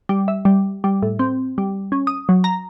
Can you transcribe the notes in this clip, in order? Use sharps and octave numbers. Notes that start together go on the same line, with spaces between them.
G3
E5
G3
G3
A2
C4
G3
C#4
D#6
F#3
A#5